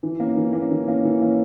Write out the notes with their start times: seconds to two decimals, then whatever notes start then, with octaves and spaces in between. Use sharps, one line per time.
0.03 E3
0.20 A#3 C#4
0.37 E3
0.53 A#3 C#4
0.71 E3
0.88 A#3 C#4
1.05 E3
1.22 A#3 C#4